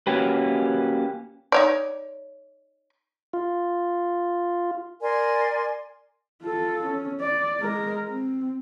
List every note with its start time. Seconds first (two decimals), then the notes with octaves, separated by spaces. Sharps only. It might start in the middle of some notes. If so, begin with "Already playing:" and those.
0.07 A#3 C#4 F#4 G4 B4
1.52 D#4 C#5 D5
3.33 F4
5.01 A#4 D5 G#5 C6
6.42 F4 A4
6.86 C#4
7.21 D5
7.60 G#3 A#4
8.08 C4